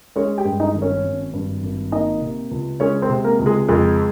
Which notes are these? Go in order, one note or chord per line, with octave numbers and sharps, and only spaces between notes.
G#3 C#4 C#5
G4 G5
G2
D#4 D#5
G#1
C#4 C#5
G#1
G2
G#1
A#3 D#4 D#5
C3
C#2
G#3 C#4 C#5
C4 C5
C3
A#3 A#4
C#2
G#3 G#4
F2 G#3 G#4